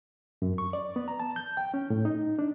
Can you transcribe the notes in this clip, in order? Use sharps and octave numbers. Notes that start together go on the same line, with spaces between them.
F#2
C#6
D5
B3
A#5
A5
G6
G5
C#4
A2
D#4
D4